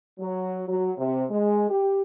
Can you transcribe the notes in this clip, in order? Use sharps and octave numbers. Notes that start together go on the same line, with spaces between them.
F#3
F#3
C3
G#3
G4